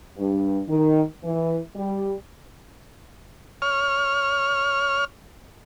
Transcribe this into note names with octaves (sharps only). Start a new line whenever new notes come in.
G2
D#3
E3
G3
C#5 F6